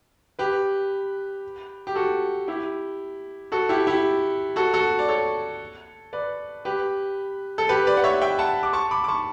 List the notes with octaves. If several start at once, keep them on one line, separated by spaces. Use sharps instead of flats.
G4 B4
G4
F#4 A4
E4 G4
F#4 A4
E4 G4
E4 G4
F#4 A4
F#4 A4
D5
A4 C#5
B4 D5
G4 B4
A4
G4 B4
B4 D5
F#5
C#5 E5
E5 G5
F#5 A5
D6
A5 C#6
B5 D6
D6
A5 C#6